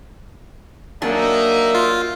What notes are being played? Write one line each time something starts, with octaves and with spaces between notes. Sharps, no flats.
F#3 A#3 D4 D#4 G#4 E5
F4